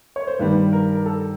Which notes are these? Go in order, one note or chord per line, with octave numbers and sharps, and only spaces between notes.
C#5
C5
G2 D#3 G3 B4
A#4
A#4
A4